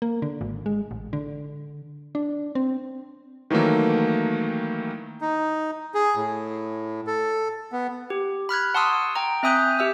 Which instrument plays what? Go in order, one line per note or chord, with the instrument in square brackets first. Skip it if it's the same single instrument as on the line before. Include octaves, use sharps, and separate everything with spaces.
[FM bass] A#3
D3
G#1
G#3
A1
D3
D4
C4
[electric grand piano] D#3 E3 F#3 A3 A#3
[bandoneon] D#4
G#4
A2
A4
B3
[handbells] G4
B5 F6 F#6 G#6
F#5 A5 C6 C#6 D#6 E6
G5 A#5
C4 E5 G#5 D#6 F#6 G6
G4 E5 E6